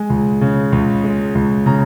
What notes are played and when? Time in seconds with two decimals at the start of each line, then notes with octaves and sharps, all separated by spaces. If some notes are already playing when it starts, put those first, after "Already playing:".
Already playing: G#3 G#5
0.10 C#2
0.41 C#3
0.72 C#2
1.04 G#3
1.35 C#2
1.66 C#3 A#5